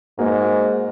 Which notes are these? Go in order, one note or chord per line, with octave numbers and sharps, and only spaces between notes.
G#2 A#3 F#4